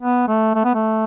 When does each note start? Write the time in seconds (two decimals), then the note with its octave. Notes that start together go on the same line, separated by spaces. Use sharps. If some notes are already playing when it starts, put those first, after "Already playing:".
0.02 B3
0.28 A3
0.55 A3
0.65 B3
0.74 A3